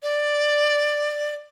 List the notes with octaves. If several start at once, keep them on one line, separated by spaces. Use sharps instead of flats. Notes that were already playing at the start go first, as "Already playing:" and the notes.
D5